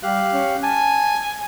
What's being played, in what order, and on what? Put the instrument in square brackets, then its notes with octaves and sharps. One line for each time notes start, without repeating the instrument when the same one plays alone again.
[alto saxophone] G3 [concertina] G4 F5 F#6
[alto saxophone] C#4
[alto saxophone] G#5 [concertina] A5